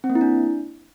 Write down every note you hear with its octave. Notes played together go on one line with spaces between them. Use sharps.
C4
A#3
E4
D4